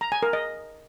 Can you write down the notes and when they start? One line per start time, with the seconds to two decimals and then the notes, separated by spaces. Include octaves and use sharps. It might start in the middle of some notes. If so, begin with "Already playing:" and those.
0.01 A#5
0.12 G#5
0.23 A#4
0.33 D#5